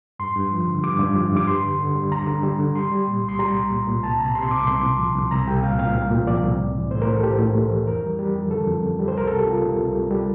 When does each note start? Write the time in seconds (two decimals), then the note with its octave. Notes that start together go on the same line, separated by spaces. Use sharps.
0.19 G2 C6
0.36 G2
0.51 F3
0.67 D3
0.84 G2 D6
0.99 G2
1.16 F3
1.32 G2 D6
1.47 G3 C6
1.63 D3
1.79 D3
1.95 G3
2.11 D2 A#5
2.27 D3
2.43 G3
2.59 D3
2.75 G3 C6
2.91 G3
3.07 A#2
3.24 C2 C6
3.39 G3 A#5
3.55 C2
3.71 A#2
3.87 A#2
4.03 C2 A5
4.19 C3 A#5
4.35 C3 C6
4.51 C2 D6
4.67 C2 C6
4.83 C2
4.99 F3
5.15 C2
5.31 C2 A#5
5.47 C2 G5
5.63 A#2 F5
5.79 A#2 F5
5.95 C2
6.11 A#2
6.27 F3 D5
6.43 C2
6.59 A2
6.75 E3
6.91 A2 C5
7.02 A#4
7.07 A2
7.12 A4
7.23 A2 G4
7.39 A2
7.55 A2
7.71 E3
7.87 F2 A#4
8.03 G3
8.19 G3
8.35 F2
8.51 D3 A4
8.67 F2
8.83 F2
8.99 G3
9.08 C5
9.15 C2 A#4
9.27 C3 A4
9.37 G4
9.46 C3 F4
9.63 C3
9.78 C2
9.95 G3
10.11 G3